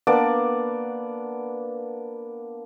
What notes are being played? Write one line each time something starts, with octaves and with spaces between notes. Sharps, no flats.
A#3 B3 D4 D5